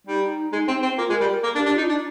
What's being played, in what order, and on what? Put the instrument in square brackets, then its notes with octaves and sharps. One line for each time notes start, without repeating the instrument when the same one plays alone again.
[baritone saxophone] G3 [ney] D#4
[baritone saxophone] G#3
C4
C4
[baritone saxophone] A#3 [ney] F4
[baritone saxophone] G#3
[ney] A#4
[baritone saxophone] G3
[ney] A#4
[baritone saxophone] A#3 [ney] A#4
[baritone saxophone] D4
[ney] G4
[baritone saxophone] D4
[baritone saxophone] D#4 [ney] F4
[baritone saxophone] D4 [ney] D#4